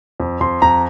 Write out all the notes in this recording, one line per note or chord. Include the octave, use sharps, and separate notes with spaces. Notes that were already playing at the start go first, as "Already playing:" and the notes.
F2
F2 C6
F2 A#5